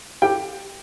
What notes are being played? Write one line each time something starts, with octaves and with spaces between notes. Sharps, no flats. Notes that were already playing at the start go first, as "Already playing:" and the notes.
G4 G5